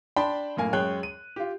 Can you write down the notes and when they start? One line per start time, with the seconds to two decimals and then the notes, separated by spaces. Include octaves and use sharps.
0.16 D4 G5 A5 B5 C6
0.57 F#2 A2 A#3 G#5
0.73 F#2 G#3 C#5 G5 F#6
1.03 D#7
1.36 F4 G4